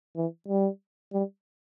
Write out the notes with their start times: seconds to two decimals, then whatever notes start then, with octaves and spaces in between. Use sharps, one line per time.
0.16 E3
0.48 G3
1.13 G3